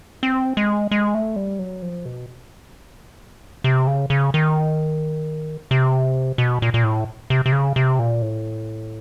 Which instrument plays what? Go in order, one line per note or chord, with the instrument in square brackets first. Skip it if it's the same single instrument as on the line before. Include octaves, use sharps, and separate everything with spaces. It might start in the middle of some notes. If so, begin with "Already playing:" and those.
[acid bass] C4
G#3
G#3
A3
G3
F#3
F3
B2
C3
C#3
C#3
D#3
C3
B2
A#2
A#2
A2
C3
C3
C#3
C3
A#2
A2